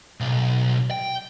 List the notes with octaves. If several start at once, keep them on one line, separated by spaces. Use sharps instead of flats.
B1
G5